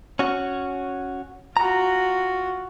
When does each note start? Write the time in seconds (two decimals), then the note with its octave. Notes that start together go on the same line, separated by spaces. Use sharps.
0.19 C#4 F#4
1.57 F4 F#4 A#5